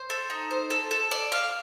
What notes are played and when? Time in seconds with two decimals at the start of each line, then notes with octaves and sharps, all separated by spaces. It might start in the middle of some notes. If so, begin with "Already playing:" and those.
Already playing: C5
0.10 A4
0.30 D#4
0.51 C5
0.70 A4
0.91 A4
1.11 D5
1.32 F5